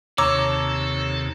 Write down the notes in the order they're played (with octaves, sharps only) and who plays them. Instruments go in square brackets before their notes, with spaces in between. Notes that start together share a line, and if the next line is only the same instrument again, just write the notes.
[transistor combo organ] D#2 C3 [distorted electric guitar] A4 [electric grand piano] C#5 A#5 E6 [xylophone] D6